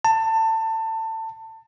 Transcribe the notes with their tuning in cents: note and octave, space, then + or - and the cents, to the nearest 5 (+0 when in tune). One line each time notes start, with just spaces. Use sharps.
A5 +25